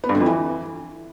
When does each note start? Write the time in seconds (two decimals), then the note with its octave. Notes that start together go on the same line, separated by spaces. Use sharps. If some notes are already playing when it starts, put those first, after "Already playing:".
0.04 B3
0.09 G2
0.15 D3
0.20 F2
0.26 E3